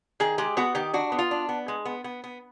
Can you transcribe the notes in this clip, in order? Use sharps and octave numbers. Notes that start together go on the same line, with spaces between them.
D#3 G#4
G#3 G4
B3 F#4
D#3 G4
D4 F#4
B3
F4
D4
B3
G#3
B3
B3
B3